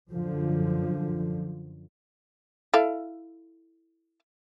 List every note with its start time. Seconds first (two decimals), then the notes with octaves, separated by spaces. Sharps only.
0.12 F#2 D3 F3
2.74 E4 A4 F5